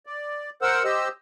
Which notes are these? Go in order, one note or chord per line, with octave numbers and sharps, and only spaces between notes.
D5
A#4 C5 F#5 E6
G4 C5 D#5 E6